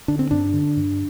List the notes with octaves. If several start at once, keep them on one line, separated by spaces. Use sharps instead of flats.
D3 D4
C4
G2 D4
D3
G2